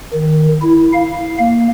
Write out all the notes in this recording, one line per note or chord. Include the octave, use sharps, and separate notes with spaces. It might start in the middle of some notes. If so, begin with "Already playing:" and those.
D#3
E4
F5
A#3